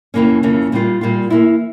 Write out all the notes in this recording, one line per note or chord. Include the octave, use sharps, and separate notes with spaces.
F2 C#3 E3 A#3 C#4
F2 C#3 E3 A#3 C#4
A#2 G3 A#3 F4
A#2 G3 A#3 F4
E3 A#3 E4